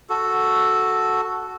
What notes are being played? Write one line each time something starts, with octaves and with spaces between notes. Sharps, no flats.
F#4 A4